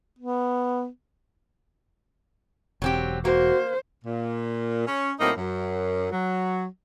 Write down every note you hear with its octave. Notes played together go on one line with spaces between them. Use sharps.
B3
E1 F#3 C4 G4
A#3 F#4 C5
A#2
C#4
A2 F#3 A#3 C4 D#4
F#2
F#3